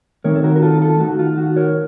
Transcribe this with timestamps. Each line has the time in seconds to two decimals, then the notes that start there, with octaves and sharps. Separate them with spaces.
0.24 D#3 A3 C4 D#4 A#4 C#5
0.36 A4
0.43 F#4 A#4
0.56 A#4
0.62 F4 A4
0.81 F4 A4
1.00 D#3 A3 C4 D#4 F#4
1.19 F4
1.38 F#4
1.56 A#4 C#5